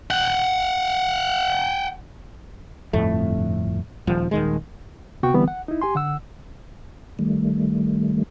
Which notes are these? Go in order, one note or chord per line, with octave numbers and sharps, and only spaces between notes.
F#5 G5
G1 F2 A2 A3
D#1 F3
D#1 D#3 G#3
D2 C3 B3 F#4 G5 C#6
D3 E3 G3 B3 C4
F#5
D#4 E4
G4 G#5 C6
D3 F#5 E6
D#3 G3 A3